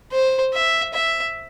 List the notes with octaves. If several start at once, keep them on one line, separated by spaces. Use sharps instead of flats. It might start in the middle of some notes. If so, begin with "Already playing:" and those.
C5
E5
E5